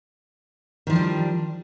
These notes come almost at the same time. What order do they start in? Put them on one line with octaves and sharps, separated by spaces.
D#3 F3 D4 G3